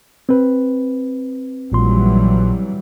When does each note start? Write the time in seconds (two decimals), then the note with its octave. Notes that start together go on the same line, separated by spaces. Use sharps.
0.29 C4 B4
1.72 A#1 A#2 E3 F#3 G3 C6